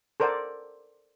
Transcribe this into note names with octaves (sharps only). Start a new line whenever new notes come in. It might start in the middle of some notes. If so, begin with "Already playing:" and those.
A4 A#4 C5 D5 F#5